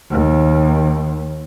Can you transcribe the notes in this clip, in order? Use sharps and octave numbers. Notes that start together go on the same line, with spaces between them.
D#2